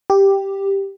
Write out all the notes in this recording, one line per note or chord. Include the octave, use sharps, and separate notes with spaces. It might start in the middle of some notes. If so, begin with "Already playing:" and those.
G4